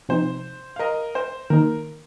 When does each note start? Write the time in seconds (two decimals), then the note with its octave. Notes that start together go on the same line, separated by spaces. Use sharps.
0.09 C3 F3 C4 D#4 C5
0.76 F5
0.79 A#4 D#5
1.15 C5
1.50 D#3 A#3 D#4 A#4